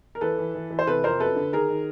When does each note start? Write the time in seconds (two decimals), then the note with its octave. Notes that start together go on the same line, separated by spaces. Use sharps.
0.15 A#4
0.21 E3 A4 B4
0.38 E3
0.55 E3
0.71 E3
0.79 C5
0.87 C3 A4 B4
1.04 F2 A#4 C5
1.19 F#2 A4 B4
1.36 D3
1.52 D#3 G#4 A#4
1.70 D#3